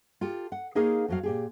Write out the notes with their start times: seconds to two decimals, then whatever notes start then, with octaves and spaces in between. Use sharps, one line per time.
0.21 F4 G4 A4
0.52 F#5
0.75 A#3 D#4 G#4 A#4 C#5 F5
1.08 F2 F#3 F5
1.23 A#2 G4 G#4